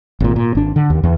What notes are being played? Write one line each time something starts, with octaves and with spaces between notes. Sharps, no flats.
G#1 A#2
A#2
G#1 D4
D3
D#2
E2